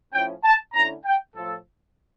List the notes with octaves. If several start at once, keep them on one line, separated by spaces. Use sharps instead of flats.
A2 F3 C#4 E4 G5
A5
D3 A3 C#4 E4 A#5
G5
A2 F3 A3 A4